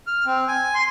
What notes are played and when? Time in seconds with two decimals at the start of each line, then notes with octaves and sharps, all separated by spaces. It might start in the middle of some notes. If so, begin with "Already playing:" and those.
0.07 F6
0.26 C4
0.48 G#5
0.75 C6